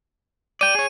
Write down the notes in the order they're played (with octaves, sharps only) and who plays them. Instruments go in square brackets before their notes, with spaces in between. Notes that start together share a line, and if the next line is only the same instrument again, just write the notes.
[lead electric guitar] D5 G5 [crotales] D#7
[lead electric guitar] G#4 C#5